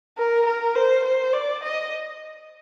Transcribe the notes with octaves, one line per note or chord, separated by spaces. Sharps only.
A#4
A#4
C5
C5
D5
D#5